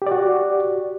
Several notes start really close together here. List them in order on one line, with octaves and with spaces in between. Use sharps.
G4 D5 F#4